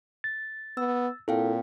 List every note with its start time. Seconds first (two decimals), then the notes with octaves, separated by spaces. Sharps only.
0.24 A6
0.77 B3 E6
1.28 A#2 C4 E4 A4 F5 G5